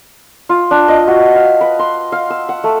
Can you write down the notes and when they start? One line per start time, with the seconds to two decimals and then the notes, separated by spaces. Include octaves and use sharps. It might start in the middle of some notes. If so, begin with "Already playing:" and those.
0.49 F4
0.71 D4
0.88 D#5
1.07 F#4
1.36 F5
1.61 B4
1.79 C6
2.12 F5
2.30 E6
2.49 F#5
2.64 A3